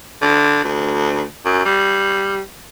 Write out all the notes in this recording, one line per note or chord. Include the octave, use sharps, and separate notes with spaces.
D3
D2
F#2
G3